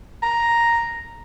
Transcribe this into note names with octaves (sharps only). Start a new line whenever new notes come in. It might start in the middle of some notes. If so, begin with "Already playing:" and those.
A#5